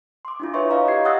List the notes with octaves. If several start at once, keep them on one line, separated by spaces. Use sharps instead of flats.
C6 D6
D4 E4 F4
B4 C#5 E5 C6 C#6
C#5 D#5 F5 A#5
G4 D#5 G#6 C7
F#5 D#6 E6 F#6 A6 A#6